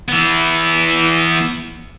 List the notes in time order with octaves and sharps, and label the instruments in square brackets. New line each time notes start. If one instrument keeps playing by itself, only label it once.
[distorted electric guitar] E3 B3